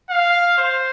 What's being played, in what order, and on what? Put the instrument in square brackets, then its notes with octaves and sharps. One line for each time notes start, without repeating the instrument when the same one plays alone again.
[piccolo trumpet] F5
C5